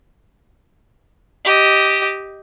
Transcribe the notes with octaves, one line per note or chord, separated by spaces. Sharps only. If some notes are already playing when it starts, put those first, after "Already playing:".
G4 D#5